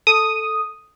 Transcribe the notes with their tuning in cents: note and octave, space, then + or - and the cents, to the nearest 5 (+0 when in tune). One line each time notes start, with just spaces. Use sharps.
A4 +0 D#6 +0